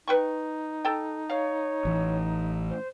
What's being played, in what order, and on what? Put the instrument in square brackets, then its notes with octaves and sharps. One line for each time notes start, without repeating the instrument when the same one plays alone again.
[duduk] D#4 [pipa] B4 G5 C#6
[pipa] A4 G5
[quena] C#5 [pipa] F5
[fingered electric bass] A1 E3
[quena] C5